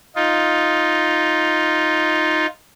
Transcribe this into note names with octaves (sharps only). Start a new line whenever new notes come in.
D#4 F4